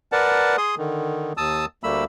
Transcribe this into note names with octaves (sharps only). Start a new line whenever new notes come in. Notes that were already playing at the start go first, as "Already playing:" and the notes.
A#4 B4 D5 F#5 A5
G#4 C6 D#6
D3 D#3
D#2 A5 D#6 E6
D2 G3 A3 A#3 B5 E6